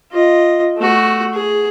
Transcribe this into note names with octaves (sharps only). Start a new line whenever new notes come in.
F4 D#5
A3 F#4
G#4